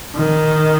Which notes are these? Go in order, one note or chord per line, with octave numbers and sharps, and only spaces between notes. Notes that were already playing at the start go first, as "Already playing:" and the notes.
D#3